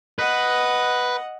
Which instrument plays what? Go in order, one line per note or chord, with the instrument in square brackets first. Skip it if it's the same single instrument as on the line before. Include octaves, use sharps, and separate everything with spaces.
[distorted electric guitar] B4 [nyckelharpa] D#5 F#5